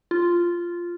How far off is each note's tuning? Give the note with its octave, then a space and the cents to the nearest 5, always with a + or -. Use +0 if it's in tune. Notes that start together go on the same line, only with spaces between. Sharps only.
F4 -5